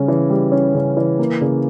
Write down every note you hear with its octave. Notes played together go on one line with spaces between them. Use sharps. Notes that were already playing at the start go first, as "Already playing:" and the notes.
Already playing: C#3 G3 C#4
E3
G3
C#4
C#3
E3
A#3
C#3